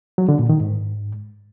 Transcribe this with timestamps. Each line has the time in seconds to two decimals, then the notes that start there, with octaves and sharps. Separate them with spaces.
0.18 F#3
0.29 D3
0.39 A#2
0.49 D#3
0.60 G#2